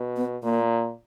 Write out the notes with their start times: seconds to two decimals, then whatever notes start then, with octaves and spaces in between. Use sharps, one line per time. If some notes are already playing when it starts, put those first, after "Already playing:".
Already playing: B2
0.17 B3
0.43 A#2 A#3